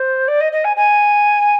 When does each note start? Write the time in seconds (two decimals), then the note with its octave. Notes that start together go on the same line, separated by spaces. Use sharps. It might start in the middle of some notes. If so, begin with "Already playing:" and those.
Already playing: C5
0.27 D5
0.40 D#5
0.52 D#5
0.64 G#5
0.76 G#5